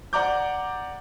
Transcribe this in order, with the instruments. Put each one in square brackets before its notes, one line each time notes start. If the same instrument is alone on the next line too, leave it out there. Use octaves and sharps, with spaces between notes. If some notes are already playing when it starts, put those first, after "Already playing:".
[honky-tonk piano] D5 F#5 A#5 D6 G6